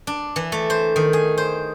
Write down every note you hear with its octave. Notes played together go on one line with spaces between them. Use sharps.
D4
E3
A3
C5
D#3
G#4
C5